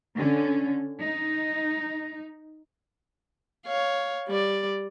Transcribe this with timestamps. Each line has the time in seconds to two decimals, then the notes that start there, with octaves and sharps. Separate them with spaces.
0.16 D3 C#4
1.01 D#4
3.66 C#5 F5
4.28 G3 D5